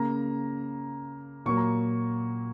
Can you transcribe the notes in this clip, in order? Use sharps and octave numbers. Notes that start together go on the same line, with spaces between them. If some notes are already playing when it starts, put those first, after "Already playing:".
Already playing: C#3 A#3 A#5
A#2 F#3 A#3 C#6
A#5